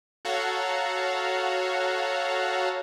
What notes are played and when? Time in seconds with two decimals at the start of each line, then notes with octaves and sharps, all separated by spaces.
0.25 F#4 A4 C#5 F5 F#5 A#5